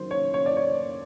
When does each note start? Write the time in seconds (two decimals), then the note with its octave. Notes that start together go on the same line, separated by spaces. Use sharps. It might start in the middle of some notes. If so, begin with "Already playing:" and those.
Already playing: D#3 F#3 C5
0.11 C#5
0.34 C#5
0.46 D5
0.57 C#5